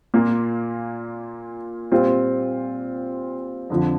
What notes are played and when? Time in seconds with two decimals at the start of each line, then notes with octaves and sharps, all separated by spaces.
0.14 A#2 A#3 F4
1.92 A#2 G3 C4 F4
3.70 F2 D3 F3